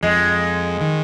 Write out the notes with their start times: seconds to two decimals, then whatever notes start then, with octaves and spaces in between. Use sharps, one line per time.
0.03 F2 F3 G#3
0.81 D#3